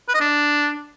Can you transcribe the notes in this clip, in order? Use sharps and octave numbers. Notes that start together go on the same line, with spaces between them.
B4
D#5
D4